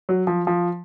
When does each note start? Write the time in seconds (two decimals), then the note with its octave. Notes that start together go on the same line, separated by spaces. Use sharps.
0.09 F#3
0.27 F3
0.47 F3